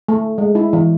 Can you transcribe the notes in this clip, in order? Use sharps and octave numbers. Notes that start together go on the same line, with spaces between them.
A3
G#3
E4
E3